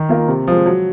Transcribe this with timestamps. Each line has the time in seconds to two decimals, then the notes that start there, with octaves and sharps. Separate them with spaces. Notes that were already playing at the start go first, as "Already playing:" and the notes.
Already playing: D#3
0.09 A#3 F4 A#4
0.28 C3
0.47 F3 G#3
0.66 F#3